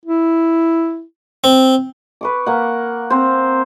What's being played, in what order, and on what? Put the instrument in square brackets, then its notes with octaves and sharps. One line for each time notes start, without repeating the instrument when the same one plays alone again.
[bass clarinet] E4
[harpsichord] C4
[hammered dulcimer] B4 C#6 D6
A#3 F#5
C4 C5